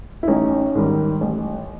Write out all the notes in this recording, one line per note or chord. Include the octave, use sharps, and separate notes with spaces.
E4
A1 C#4 D#4
G#2 D#3 G3
A1